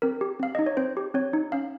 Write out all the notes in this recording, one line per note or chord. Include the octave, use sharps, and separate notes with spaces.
C4 A#4
G4
C4 F5
D#4 D#5
C#5
C4 C5
G4
C4 C#5
D#4
C#4 F5